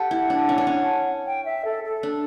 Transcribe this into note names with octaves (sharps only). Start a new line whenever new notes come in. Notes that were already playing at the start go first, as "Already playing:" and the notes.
Already playing: G4 A4 F#5
E4
D4
C#4
D4
C#4
G5
E5
A4
A4
D4